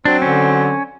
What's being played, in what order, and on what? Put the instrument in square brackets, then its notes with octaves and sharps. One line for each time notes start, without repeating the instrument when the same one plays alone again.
[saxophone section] F#3 C4 [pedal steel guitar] D4
[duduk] D3 [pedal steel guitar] C#4